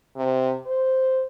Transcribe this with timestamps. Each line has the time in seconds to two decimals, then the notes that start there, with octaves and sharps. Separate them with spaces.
0.17 C3
0.66 C5